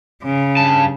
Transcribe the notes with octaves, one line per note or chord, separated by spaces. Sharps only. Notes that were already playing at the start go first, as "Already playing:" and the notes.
C#3
G2 A5